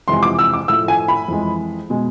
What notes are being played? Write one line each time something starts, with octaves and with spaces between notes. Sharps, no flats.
F2 C3 E3 G#3 C6
D6
E6
D6
A2 F3 A3 E6
G#5
B5
F2 E3 G#3
B2 G#3